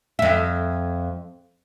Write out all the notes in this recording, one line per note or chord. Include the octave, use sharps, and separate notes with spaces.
F2 E5